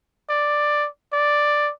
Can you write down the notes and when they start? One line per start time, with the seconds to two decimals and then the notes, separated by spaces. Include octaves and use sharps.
0.29 D5
1.13 D5